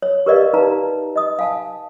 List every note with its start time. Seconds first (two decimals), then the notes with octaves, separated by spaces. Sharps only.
0.02 C#5
0.26 G4 A#4 B4 D5 D#5 F5
0.53 D#4 B4 F5 A5 A#5
1.16 D#5 D#6
1.39 F5 G#5 A5